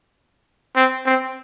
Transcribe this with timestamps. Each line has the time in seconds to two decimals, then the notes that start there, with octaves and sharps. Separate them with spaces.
0.76 C4
1.06 C4